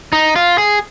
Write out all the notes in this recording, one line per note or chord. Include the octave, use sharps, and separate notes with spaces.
D#4
F4
G#4